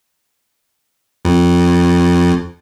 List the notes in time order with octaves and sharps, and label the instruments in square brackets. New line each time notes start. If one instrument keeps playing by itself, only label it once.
[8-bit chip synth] F2